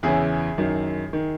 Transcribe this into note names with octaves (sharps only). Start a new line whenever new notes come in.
E2 C#3 E3 E4 G#4
F#2 D#3
D#3